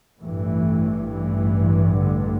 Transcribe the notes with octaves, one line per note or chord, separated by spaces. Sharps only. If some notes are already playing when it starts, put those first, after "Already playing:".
A1 G2 E3 A3
E3
D3